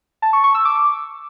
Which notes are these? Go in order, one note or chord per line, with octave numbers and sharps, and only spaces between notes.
A5
C#6
C#6
E6
D6